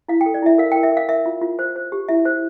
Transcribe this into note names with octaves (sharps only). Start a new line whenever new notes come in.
E4 F5
G5
A4
D5
E4 E5
A#4 F5
G5
A#4
E5
A#4 F5
A#4 E5
F4
F4
C5
C5
G4
E4 E5
C5